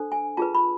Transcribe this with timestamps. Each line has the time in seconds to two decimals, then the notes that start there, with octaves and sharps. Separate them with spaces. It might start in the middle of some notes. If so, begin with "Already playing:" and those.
Already playing: D4 A4 C5
0.12 G#5
0.37 F4 G#4 B4 A5
0.55 B5